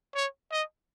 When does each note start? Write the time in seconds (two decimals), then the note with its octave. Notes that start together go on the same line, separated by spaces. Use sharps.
0.15 C#5
0.52 D#5